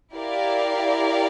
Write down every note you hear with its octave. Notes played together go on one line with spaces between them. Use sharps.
E4 G4 A#4 D5 F5